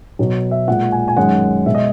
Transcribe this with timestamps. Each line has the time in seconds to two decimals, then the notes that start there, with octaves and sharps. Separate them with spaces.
0.19 B2 F#3
0.51 E5
0.68 A#2 G#3 F#5
0.92 G#5
1.08 G#5
1.17 F#2 D#3 G#3 F#5
1.66 B2 G#3 E5
1.75 D#5